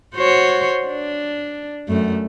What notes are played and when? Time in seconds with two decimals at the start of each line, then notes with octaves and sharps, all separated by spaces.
0.15 F#4 C5 C#5
0.87 D4
1.88 F#2 A3